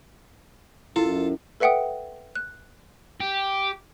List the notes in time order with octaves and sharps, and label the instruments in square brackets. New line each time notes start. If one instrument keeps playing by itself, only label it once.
[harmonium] F#2 [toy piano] E4 A#4 [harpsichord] F4 A4
[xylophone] A4 B4 E5 F#5 G5 D#6
F#6
[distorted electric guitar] G4